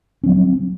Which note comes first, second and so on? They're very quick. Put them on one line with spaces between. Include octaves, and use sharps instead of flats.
C#4 F#3 C4